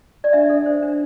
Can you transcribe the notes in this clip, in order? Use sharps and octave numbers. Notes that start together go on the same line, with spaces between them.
D5
D4 E5
A4
C5
D4